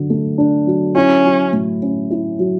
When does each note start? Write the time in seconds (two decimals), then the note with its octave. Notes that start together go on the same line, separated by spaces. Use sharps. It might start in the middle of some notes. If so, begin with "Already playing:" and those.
Already playing: D3 F#3
0.10 A3
0.38 D4
0.67 F#3
0.95 C#4 E4
1.25 F#3
1.53 A2
1.82 C#4
2.10 E4
2.39 F#3